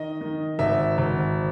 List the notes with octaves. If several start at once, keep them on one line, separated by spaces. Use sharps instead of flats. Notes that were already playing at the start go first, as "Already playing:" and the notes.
Already playing: D#3 D#5
D#3
G#1 E5
G#1